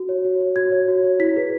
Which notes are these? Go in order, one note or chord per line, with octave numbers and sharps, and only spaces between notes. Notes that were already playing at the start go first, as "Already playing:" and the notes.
Already playing: F#4
C#5
F#4
C#5
F#4 G#6
C#5
F#4
C#5
E4 B6
G#4 B4